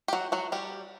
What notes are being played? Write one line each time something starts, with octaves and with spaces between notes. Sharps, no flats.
G4
F#3 F#4
F#3 F#4
G3 G4